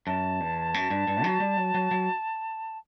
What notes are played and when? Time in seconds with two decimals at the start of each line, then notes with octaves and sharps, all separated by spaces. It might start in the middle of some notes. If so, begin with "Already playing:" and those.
0.07 F#2 A5
0.40 E2
0.74 F#2
0.90 G2
1.08 G2
1.24 F#3
1.40 G3
1.57 F#3
1.74 F#3
1.91 F#3